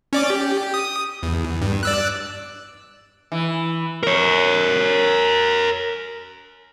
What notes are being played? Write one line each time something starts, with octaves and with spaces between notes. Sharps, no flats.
C#4 D5 D6
G4
D#6
E2
G2
D5 E6 F#6
E3
A#4 C#5